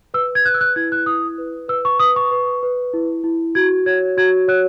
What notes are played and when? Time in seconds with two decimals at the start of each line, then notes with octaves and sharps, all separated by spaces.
0.14 B4 E6
0.35 G#6
0.45 B4 F#6
0.54 E6
0.61 F#6
0.76 E4 G#6
0.92 F#6
1.06 E4 D#6
1.38 B4
1.68 B4 E6
1.85 C#6
1.99 B4 D#6
2.16 C#6
2.31 B4
2.63 B4
2.93 E4
3.24 E4
3.55 F#4 G#6
3.86 C#5 G#6
4.17 F#4 G#6
4.48 C#5 F#6